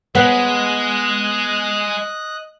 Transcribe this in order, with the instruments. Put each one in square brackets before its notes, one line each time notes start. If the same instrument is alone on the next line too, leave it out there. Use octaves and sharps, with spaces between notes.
[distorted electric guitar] G#3 [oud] B3 [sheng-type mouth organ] D#5 F#6